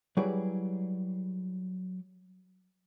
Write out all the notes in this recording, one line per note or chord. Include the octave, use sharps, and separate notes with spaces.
F#3 G3 E4 G#4 B4 D5